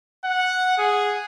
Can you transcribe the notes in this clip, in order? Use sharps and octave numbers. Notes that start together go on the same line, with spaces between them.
F#5
G#4